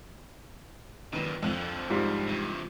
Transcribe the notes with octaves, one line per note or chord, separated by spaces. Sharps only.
F#2 A#2 D#3 B4
F2 D3 F3 F#6
G#2 G3 F4 G4
G2 C3